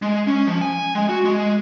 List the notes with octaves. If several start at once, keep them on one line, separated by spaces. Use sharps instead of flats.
G#3
C#4
F3
G#5
G#3
F#4
G#3